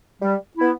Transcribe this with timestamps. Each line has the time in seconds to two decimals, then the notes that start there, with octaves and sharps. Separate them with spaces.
0.22 G3
0.58 B3 E4